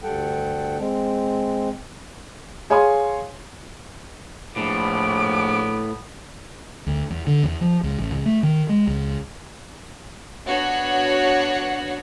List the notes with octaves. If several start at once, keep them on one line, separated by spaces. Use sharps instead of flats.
D2 G2 G3 A4 F#5 G5
G#3 C4
G#4 C#5 F5 G#5 C6 D#6
A#1 A2 B3 D6
D2
E2
D3
E2
F3
C#2
A1
C#2
A3
D#3
G#3
C#2
B3 D4 F#4 C#5 F#5